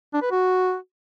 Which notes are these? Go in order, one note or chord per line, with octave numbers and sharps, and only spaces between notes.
D4
B4
F#4